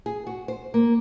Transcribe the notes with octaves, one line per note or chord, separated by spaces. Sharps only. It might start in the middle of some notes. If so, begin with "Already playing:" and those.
G#4
F#4
C5
A#3